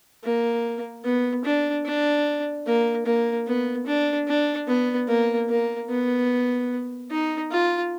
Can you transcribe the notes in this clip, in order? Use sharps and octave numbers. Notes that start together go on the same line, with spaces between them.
A#3
B3
D4
D4
A#3
A#3
B3
D4
D4
B3
A#3
A#3
B3
D#4
F4